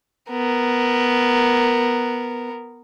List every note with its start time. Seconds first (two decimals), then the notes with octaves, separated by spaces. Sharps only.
0.31 B3 A#4